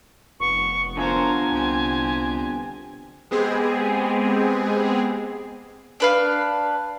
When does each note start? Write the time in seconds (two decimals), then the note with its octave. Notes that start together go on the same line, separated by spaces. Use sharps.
0.40 F1 B3 C#6
0.97 D3 B3 F4 A#4 C5 G#5
1.52 C2 C4 G4
3.31 G#3 B3 C4 G4 G#4
6.00 D4 B4 F5